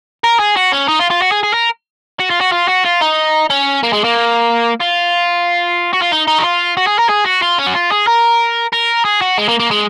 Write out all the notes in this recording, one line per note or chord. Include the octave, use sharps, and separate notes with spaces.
A#4
G#4
F#4
C#4
D#4
F4
F4
F#4
G#4
G#4
A#4
F#4
F4
F#4
F4
F#4
F4
D#4
C#4
A#3
G#3
A#3
F4
F#4
F4
D#4
D#4
F#4
F4
F#4
G#4
A#4
G#4
F#4
F4
C#4
F#4
F4
G#4
A#4
A#4
G#4
F#4
G#3
A#3
A#3
G#3